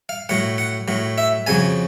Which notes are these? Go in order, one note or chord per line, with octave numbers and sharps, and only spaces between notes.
F5
A2 F#3 F#5
F#5
A2 F#3
E5
F2 C#3 F#3 G#5